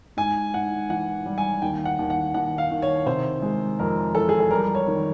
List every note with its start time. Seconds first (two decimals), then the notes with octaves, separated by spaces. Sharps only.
0.17 G#2 G#5
0.54 G#2 F#5
0.89 E3 F#5
1.26 G3
1.38 G#5
1.62 D#2 G5
1.85 F#5
1.99 D#2
2.10 F#5
2.34 D#2 F#5
2.58 F5
2.71 D#3
2.82 C#5
3.06 C3 C5
3.42 G#3
3.79 F2 A#4
4.15 E3 A4
4.29 G#4
4.40 A4
4.51 G3 A#4
4.75 C#5
4.87 D#3